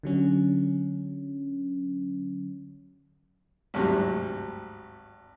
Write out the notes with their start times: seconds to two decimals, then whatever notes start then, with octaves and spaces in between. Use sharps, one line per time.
0.03 D3 F#3 C#4
3.74 G#1 D2 G2 C3 F#3